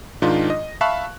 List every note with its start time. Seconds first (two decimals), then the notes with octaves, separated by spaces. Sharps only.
0.22 G#2 D#3 D4 D#4 F4
0.50 D#5
0.81 E5 F5 A5 B5 C#6 F#6